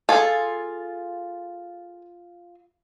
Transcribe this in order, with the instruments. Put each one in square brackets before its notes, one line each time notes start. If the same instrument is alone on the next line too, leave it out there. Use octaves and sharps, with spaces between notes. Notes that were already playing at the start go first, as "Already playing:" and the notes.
[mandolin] F4 [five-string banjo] G#4 A4